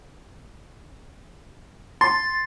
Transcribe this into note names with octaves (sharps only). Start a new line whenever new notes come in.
C6 A6